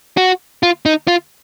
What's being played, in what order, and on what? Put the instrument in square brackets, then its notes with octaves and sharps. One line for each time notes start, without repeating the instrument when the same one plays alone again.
[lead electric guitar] F#4
F4
D#4
F4